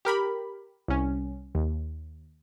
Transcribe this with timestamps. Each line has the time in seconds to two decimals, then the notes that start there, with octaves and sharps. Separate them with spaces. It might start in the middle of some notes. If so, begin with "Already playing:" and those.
0.05 G4 A#4 B5
0.88 C2 C#4
1.55 D#2